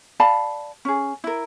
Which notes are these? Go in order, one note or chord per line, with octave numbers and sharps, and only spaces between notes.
D5 F5 A5 B5
C#4 G#4
E4 A#4